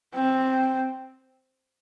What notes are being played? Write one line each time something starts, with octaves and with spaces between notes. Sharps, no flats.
C4